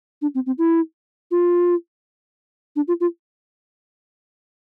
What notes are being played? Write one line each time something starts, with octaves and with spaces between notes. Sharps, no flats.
D4
C4
C4
E4
F4
D4
F4
F4